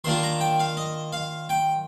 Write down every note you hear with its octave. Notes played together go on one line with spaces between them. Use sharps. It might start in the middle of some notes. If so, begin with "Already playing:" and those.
D#3 A#3 D4 F4 C6
A#5
G5
F5
D#5
F5
G5